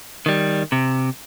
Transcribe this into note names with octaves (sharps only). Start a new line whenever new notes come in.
D#3 G3
C3